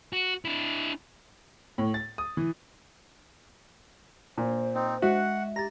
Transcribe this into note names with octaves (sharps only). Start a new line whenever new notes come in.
F#4
D4 E4
A2
A6
D#6
E3
A#2 C5
C4 D#4
G#3 F#4 E5 F#5
G4 A#5 A6 A#6